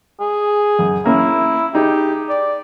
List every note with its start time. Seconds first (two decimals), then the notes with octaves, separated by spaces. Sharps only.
0.20 G#4
0.79 F#2
1.06 A#3 C#4 E4
1.75 D#4 G4 G#4
2.29 D5